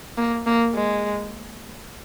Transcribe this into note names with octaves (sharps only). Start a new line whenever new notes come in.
A#3
A#3
G#3